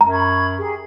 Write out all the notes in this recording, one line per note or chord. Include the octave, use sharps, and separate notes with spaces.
F#2 A#5
B5 C#6 G#6
G4 G#4